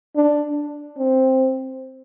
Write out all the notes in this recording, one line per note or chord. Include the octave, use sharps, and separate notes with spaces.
D4
C4